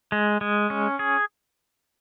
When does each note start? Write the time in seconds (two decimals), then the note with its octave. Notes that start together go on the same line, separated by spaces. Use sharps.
0.12 G#3
0.41 G#3
0.70 C#4
0.99 G#4